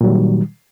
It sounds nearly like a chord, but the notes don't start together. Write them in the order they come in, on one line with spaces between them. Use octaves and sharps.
A#2 F#3 G3 D#3